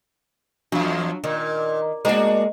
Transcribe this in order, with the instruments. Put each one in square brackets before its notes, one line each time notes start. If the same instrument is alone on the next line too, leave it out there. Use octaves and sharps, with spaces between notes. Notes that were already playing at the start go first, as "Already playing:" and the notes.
[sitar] E2 F3 [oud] F#3 [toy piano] D4 F4 F5
[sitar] A#2 [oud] D#3
[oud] G#3 A#3 [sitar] D4 F#4 A#4 [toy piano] C5 D#5